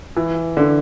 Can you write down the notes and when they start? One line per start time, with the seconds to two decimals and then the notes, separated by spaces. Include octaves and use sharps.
0.17 E3
0.57 D3